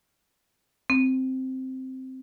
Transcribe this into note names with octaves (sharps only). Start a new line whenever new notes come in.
C4